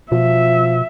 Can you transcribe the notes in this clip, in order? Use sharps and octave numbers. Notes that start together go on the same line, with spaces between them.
B2 F3 E5